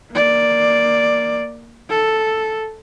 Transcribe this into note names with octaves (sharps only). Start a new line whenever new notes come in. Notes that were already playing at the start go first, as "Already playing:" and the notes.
A#3 D5
A4